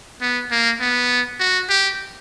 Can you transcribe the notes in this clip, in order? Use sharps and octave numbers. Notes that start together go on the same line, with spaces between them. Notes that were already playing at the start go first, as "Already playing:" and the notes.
B3
A#3
B3
F#4
G4